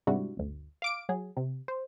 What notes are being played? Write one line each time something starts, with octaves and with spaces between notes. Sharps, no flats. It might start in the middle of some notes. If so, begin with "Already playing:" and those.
G#2 C3 G3 D4 E4 F#4
G1 D2
F5 D6 D7
F#3 G#4
C3
C5